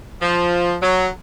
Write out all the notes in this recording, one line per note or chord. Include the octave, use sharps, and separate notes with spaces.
F3
F#3